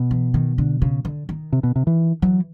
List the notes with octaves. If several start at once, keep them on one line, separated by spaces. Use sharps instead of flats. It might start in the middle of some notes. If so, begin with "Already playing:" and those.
Already playing: B2
E3
D#3
D3
C#3
D3
D#3
C3
B2
C3
E3
E3 F#3